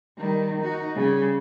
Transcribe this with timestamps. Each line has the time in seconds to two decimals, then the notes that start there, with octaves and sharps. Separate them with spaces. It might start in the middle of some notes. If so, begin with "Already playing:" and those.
0.18 D#3 G3
0.61 D#4 F#4
0.96 C#3 G3